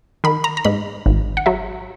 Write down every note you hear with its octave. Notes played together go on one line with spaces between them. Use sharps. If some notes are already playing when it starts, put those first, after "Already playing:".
D#3 B5
A#5
A#5
G#2 B5
G#1
F#5
F#3 E5